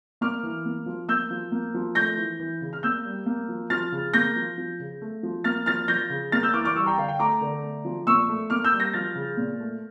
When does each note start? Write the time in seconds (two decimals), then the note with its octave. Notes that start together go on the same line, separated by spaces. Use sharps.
0.21 A#3 D6 F6
0.43 E3
0.65 A#3
0.86 F3
1.08 A#3 E6 G6
1.31 F3
1.52 A#3
1.74 F3
1.95 A3 G6 A#6
2.18 E3
2.40 E3
2.61 C#3
2.73 F6
2.83 A#3 E6 G6
3.05 G3
3.26 A#3
3.49 F3
3.70 F3 F6 A6
3.92 C#3
4.13 A#3 G6 A#6
4.36 F3
4.58 F3
4.80 C#3
5.02 A3
5.23 F3
5.44 A#3 F6 A6
5.66 F3 F6 A6
5.88 F3 G6 A#6
6.10 C#3
6.32 A#3 F6 A6
6.43 E6 G6
6.54 E3 D6 F6
6.65 D6 F6
6.75 G3 C#6 E6
6.86 G5 A#5
6.97 D3 F5
7.08 G5
7.19 A3 A#5 D6
7.41 D3
7.63 A3
7.85 F3
8.07 A#2 C#6 E6
8.29 A3
8.50 A#3 D6 F6
8.64 E6 G6
8.72 G3
8.80 G6 A#6
8.94 F3 F6 A6
9.15 C#3
9.37 A#2
9.60 A3